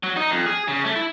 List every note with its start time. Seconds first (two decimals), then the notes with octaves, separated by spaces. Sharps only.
0.03 F#3
0.17 D#4
0.31 F2
0.46 G#4
0.68 C#3
0.84 A3
0.96 E4